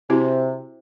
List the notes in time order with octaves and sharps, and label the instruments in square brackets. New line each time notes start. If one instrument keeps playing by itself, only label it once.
[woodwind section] C3 [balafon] C4 E4 F#4